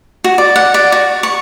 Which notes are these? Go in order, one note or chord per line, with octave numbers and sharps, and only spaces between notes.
F#4
D5
F#5
D5
F#4
C#6